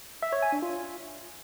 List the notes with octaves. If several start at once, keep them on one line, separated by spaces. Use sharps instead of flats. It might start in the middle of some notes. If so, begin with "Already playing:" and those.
E5
C#5
G#5
D4
F4